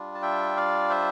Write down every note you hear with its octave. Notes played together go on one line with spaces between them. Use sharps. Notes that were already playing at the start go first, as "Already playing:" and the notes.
Already playing: G3 D4 F4
A5
E5 G5
D5 F5
C5 E5